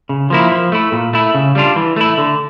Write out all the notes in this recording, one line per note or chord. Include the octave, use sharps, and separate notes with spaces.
C#3
F3 A#3 E4
F3
A3 E4
A#2
A3 E4
C#3
G3 D4 F4
E3
A3 E4
D3